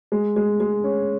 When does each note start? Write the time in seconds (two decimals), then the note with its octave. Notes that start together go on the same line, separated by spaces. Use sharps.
0.12 G#3
0.36 G#3
0.60 G#3
0.84 C#4